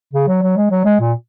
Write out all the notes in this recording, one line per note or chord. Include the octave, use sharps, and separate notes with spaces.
C#3
F#3
F#3
G#3
F#3
G#3
A#2